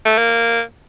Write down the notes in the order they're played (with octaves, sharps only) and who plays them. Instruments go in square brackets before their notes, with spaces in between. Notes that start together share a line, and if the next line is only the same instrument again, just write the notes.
[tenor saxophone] A3
A#3